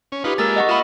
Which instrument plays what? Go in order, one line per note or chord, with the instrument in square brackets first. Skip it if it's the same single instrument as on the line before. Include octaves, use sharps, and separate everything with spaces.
[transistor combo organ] C#4
[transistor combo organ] D#4 F4 B4 [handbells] G4 B5
[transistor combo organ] G#3 A#3 [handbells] A#4 E6 A6
[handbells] D#5 F#5 C#6
[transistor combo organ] F4 D#5 E5 [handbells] B5 D#6